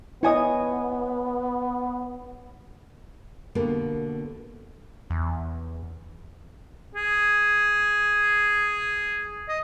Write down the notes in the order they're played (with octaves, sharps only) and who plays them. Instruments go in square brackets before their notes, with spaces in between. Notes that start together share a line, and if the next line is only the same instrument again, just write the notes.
[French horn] B3 [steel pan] E4 D#5 [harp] C#5 G#5 D#6
[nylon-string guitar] B2 D3 A#3 B3 G4
[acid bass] E2
[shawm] G#4
D#5